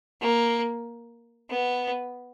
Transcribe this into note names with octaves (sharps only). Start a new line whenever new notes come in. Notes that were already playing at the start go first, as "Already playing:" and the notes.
A#3
B3